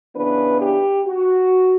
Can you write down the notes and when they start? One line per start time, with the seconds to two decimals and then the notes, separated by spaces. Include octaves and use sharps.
0.15 C#3 E3 B3 D4 B4
0.60 G4
1.06 F#4